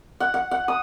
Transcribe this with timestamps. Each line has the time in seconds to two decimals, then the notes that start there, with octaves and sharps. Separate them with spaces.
0.20 F#5
0.34 F#5
0.51 F#5
0.68 D#6